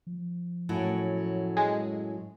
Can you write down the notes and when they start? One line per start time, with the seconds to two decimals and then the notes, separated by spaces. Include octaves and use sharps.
0.07 F3
0.69 F#2 A2 F#3
1.57 G#3